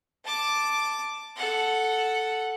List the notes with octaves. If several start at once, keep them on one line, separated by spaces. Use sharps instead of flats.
A5 D6
A4 F#5